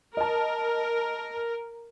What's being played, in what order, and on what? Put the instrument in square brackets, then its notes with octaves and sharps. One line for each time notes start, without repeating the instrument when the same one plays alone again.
[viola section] A#4 [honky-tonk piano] D#5 A5